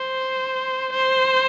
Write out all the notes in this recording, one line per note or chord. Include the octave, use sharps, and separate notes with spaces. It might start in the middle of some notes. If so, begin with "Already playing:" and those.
Already playing: C5
C5